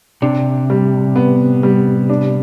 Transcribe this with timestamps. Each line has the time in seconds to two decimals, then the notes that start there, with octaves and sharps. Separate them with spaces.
0.22 C3 D4
0.70 G3
1.16 B3
1.63 G3
2.10 D4